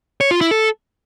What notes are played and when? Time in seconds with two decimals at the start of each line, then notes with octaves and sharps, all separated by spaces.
0.21 C#5
0.31 F4
0.41 E4
0.51 A4